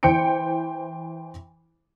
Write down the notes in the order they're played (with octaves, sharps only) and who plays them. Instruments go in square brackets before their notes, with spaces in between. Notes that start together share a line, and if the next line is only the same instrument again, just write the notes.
[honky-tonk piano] E3 C5 G5 C#7 D7